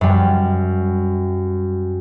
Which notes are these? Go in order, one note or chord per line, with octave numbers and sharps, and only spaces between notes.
F#2 G3